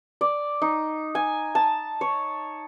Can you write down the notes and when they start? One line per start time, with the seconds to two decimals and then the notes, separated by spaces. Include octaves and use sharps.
0.21 D5
0.62 D#4
1.15 G#5
1.55 A5
2.01 C#5